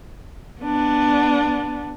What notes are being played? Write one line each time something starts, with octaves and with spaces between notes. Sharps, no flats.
B3 D4